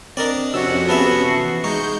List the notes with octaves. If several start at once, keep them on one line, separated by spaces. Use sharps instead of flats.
C4 D4 A#4 D5 D#5
F2 C3 C#4 F#4 E6
B3 G#4 E5 A5
E3 C7
G#3 D#4 C#6 G6